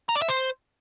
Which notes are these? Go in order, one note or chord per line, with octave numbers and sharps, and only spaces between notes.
A#5
D5
E5
C5